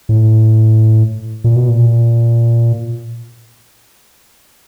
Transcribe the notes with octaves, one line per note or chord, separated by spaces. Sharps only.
A2
A#2
B2
A#2